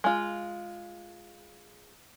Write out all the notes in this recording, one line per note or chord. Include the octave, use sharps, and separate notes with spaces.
G#3 F4